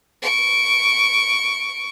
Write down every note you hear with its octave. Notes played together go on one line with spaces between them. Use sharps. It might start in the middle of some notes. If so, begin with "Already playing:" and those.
C#6 D7